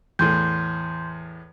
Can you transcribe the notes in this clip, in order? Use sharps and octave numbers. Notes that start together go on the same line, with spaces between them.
E2 A2 C6 G6